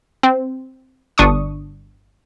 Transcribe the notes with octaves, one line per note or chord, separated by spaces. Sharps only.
C4
G1 D4 C#6 D#6